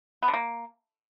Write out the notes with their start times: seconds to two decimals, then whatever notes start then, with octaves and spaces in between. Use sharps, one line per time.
0.23 B3
0.28 D3
0.34 A#3